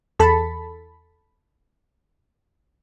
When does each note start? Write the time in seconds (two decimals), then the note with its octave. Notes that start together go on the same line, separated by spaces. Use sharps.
0.19 E2 A4 A5 B5